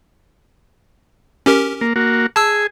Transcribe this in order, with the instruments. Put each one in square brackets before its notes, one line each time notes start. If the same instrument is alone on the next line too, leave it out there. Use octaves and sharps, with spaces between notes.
[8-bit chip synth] C#4 G4 A#4
[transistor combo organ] A#3
A#3 F#4
[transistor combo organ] G#4 [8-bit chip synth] A5 E6